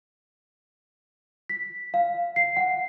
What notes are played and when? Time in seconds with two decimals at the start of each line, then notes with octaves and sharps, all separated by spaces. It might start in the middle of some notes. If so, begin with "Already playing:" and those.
1.49 B6
1.94 F5
2.36 C7
2.57 F#5